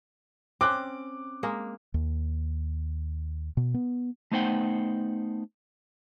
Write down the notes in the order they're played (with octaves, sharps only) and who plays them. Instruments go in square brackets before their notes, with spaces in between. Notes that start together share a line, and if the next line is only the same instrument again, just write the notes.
[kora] C4 C#4 [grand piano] D6 F#6
[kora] G#3 A#3
[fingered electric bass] D#2
B2
B3
[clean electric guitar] A3 B3 D#4 C5 F#5 G5